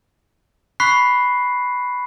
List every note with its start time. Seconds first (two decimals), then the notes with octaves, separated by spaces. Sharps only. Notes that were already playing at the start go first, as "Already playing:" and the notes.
0.80 B5 C#6 F#6 B6 C7